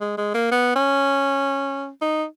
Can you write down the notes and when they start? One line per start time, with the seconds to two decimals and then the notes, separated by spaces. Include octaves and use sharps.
0.01 G#3
0.18 G#3
0.34 A#3
0.52 B3
0.76 C#4
2.02 D#4